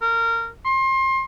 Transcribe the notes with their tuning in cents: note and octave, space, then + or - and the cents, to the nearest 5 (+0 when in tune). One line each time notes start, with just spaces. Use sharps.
A#4 -20
C6 +30